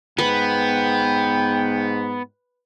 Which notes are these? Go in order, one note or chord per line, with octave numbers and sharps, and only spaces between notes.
G#2 B3 B4 G5